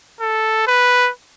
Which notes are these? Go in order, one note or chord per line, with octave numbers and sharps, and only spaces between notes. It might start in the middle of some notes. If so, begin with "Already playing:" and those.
A4
B4